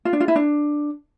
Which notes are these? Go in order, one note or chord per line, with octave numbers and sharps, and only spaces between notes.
F4
D4
F4
E4
D4